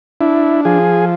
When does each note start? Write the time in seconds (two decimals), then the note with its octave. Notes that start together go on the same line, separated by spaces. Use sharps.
0.21 D4 E4
0.65 F3 G#4